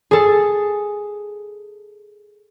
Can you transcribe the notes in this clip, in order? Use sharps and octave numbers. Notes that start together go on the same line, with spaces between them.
G#4 A4